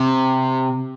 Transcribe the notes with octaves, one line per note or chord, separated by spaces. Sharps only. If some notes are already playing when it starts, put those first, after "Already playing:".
Already playing: C3